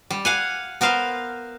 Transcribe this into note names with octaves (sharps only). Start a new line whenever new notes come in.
G3
F5 F#5 G#5
B3 A#4 C5 F5